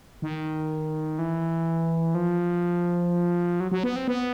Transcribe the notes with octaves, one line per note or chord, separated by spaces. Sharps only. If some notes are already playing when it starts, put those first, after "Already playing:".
D#3
E3
F3
F#3
F#3
B3
C4
B3